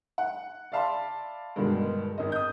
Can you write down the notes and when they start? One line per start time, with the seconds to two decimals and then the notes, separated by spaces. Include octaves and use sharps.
0.18 F#5
0.72 D5 E5 F5 A5 B5 C6
1.56 G2 B2 D3 D#3 G#3
2.18 G#1 D#5
2.32 D#6 G6